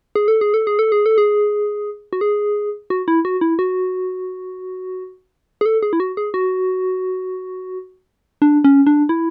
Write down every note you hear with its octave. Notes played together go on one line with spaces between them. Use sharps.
G#4
A4
G#4
A4
G#4
A4
G#4
A4
G#4
F#4
G#4
F#4
E4
F#4
E4
F#4
G#4
A4
G#4
E4
F#4
G#4
F#4
D4
C#4
D4
E4